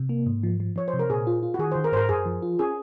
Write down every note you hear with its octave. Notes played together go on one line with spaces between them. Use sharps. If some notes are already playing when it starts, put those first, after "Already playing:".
Already playing: C3
A#3
G#2
F3
F3
F3 C#5
C5
C3
A#4
A#2 G#4
F4
F4
F#4
D#3 G#4
C5
D#3
A#4
G#2 A#4 C5
F#2 G#4
F3
F4
C#4 G#4